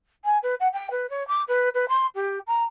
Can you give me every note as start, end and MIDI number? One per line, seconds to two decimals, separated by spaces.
0.25 0.38 80
0.43 0.55 71
0.60 0.68 78
0.73 0.88 79
0.91 1.09 71
1.10 1.26 73
1.28 1.42 86
1.48 1.69 71
1.74 1.86 71
1.89 2.06 84
2.15 2.39 67
2.47 2.64 82